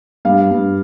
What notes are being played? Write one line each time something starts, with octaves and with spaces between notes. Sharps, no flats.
G2 F5
G2